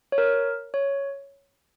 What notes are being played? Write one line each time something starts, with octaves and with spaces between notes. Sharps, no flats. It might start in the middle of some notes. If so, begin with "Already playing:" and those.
C#5
A#4
C#5